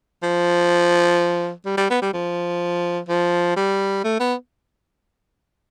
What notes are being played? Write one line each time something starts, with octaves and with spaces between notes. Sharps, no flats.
F3
G3
G3
B3
G3
F3
F3
G3
A3
B3